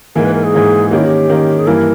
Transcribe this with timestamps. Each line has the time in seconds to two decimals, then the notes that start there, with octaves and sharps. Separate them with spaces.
0.15 G#2 E3 A#3 A#4
0.25 B4
0.34 A#4
0.44 G#4
0.54 G#2 E3 A#3
0.91 D#3 A#3 C#4 G4
0.98 E4
1.06 G4
1.29 D#3 A#3 C#4
1.59 G#4
1.67 G2 E3 A#3 E4 A#4